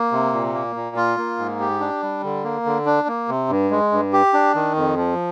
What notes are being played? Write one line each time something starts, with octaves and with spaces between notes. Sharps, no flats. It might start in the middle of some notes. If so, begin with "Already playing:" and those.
Already playing: A#3
C3
A#2
A#3
A#2
F4
A#3
G#2
G4
D4
G3
D3
A#3
D3
D4
A#3
C3
G2
G#3
G2
G4
D4
D#3
F2
F3